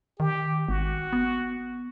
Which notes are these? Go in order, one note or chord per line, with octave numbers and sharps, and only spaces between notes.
D#3 G4
G#1 F#4
B3